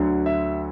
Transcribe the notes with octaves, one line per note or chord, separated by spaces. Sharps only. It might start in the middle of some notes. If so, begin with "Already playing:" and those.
Already playing: D2 D3 F#3
E5